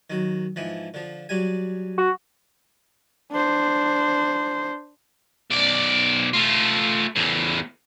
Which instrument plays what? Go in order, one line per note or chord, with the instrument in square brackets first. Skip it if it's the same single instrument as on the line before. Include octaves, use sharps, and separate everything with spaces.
[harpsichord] D#3 F#3
G#2 E3 F3
D3 F3
F#3 G3 G#5
[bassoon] F#4
[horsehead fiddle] D4 C5
[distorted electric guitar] B1 D5
A3 F4
E2 A2